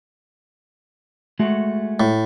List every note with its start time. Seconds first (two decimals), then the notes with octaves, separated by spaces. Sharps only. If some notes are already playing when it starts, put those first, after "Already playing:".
1.39 G#3 A3 F#4
2.00 A2